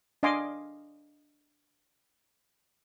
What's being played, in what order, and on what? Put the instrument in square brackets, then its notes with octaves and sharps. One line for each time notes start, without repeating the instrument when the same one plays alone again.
[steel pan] D4 D#5 F5 G#5 C6 D6